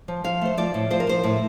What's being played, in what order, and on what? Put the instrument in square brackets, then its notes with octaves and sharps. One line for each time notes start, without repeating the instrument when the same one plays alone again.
[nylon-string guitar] F3
F3 F5
A3 C5
F3 D5
A2
F3 C5
A#4
F3 C5
A2